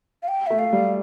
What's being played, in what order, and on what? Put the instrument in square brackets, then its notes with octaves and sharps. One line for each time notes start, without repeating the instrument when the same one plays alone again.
[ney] F5
G5
[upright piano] A3 [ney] E5
[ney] F5
[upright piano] G3